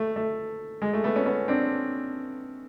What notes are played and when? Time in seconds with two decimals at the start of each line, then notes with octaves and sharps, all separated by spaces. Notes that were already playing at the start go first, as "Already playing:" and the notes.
Already playing: A3
0.16 A3
0.82 G#3
0.93 A3
1.04 A3 B3
1.16 B3 C#4
1.26 B3 C#4
1.48 C4 D4